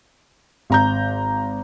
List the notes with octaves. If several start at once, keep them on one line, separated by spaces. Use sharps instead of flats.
G#1 A#5 G6